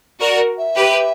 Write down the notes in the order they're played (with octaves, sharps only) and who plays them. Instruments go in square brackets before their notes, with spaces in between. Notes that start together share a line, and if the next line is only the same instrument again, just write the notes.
[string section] F#4 A#4 [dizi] D5
[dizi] E5
[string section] G4 B4